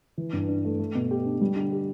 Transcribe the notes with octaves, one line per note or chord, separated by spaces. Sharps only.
E3
G2
D4
A3
A3
B2
G4
D4
G3
D3
G4